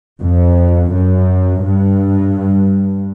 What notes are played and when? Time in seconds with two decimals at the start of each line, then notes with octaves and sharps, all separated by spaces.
0.20 F2
0.92 F#2
1.63 G2